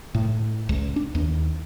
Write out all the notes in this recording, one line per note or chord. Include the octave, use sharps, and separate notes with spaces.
A2
C#2
D4
D#2